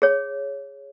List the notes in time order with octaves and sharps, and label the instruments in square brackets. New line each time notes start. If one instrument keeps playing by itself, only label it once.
[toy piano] G#4 C#5